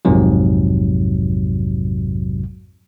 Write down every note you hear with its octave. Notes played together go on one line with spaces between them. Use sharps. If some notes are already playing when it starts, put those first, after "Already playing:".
A#1 F2 G#2 C3 F#3